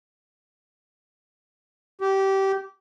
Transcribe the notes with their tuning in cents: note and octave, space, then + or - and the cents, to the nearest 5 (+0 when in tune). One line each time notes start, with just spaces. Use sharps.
G4 -20